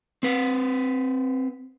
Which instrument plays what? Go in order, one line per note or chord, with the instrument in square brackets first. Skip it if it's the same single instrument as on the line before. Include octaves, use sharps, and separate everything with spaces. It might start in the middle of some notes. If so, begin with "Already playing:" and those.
[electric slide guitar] C4 B4